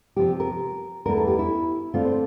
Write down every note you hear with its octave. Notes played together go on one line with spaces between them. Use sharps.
C3 F3 C4 G4
A#4
E2 E3 A3 A#4
A4
G4
E4
D3 A3 C4 F4
C5